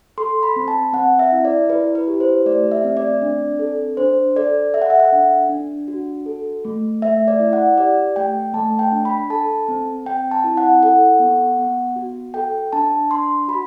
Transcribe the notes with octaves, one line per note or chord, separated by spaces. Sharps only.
A4 C6
B5
C4
A5
C4 F#5
E5
E4
D5
E4 B4
B4
G4
C5
A3 D5
E5
C4
D5
D4
A4
D4 C5
A4 D5
A4 E5
F#5
E5
F#5
D4
D4
F#4
A4
A3
A3 E5
D5
E4
F#5
G4 D5
A3 G5
A3 A5
G5
D4
B5
A4 A5
C4
C4 G5
A5
E4
F#5
A4 F#5
B3
B3
F#4
A4 G5
D4 A5
D4 C6
F#4 B5